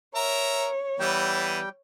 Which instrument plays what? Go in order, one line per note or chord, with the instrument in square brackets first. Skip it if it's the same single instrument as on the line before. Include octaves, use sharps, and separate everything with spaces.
[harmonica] A#4 E5 A#5 [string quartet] C#5
[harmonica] E3 B3 [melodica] G3 G5